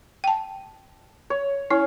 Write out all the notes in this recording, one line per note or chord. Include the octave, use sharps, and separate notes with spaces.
G5 A5
C#5
C#4 E4